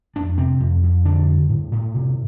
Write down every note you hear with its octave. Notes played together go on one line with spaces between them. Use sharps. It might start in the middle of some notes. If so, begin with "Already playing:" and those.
F2 D4
C3 C4
F2
F2
D3 D4
G2
A2
A2
C3